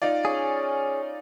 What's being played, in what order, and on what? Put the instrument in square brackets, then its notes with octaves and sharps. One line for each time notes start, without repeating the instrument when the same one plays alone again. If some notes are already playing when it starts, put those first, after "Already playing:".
[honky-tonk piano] D#4 F4 D5
[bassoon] C#4 [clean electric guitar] G#4